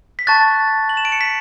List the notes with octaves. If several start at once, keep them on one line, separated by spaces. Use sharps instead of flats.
B6
A5 C#6 F#6 A6
F#7
E7
D7
C#7
B6